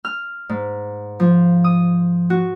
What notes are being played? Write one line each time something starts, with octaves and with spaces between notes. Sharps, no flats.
F6
G#2
F3
D#6
F#4